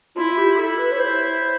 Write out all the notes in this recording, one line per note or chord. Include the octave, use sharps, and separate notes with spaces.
E4 F4
G4
E4 A4
B4
C#5
C5